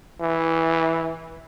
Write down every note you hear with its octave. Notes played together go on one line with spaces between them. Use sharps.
E3